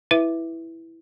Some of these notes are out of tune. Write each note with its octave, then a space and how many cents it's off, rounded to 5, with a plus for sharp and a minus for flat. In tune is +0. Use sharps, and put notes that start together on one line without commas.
E4 +0 B4 +0 E5 +0